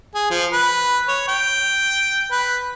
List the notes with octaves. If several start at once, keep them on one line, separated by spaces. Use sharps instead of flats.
G#4
F3
B4
C#5
G5
B4